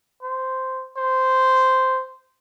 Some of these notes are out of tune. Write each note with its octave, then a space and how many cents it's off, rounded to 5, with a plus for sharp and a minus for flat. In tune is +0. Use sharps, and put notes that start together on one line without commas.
C5 -5
C5 -10